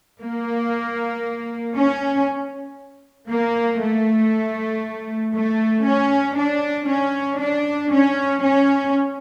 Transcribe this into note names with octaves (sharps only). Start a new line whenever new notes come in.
A#3
C#4
A#3
A3
A3
C#4
D4
C#4
D4
C#4
C#4